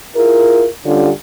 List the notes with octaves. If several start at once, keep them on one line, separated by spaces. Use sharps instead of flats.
E4 F4 G#4 A#4
D3 G3 C#4 F4 G4